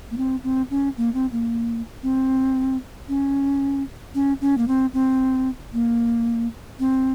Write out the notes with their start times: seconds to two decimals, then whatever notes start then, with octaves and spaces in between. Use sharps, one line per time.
0.11 A#3
0.17 C4
0.44 C4
0.71 C#4
0.97 A#3
1.14 C4
1.32 A#3
2.03 C4
3.09 C#4
4.15 C#4
4.41 C#4
4.58 A#3
4.68 C4
4.94 C4
5.73 A#3
6.79 C4